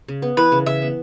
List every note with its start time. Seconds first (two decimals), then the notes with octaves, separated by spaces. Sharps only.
0.08 C#3
0.22 B3
0.37 E3 B4
0.52 C#3
0.66 C#3 E5
0.82 B3